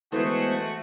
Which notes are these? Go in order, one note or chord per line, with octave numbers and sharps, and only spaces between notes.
E3 G#3 A3 B3 F#4 C5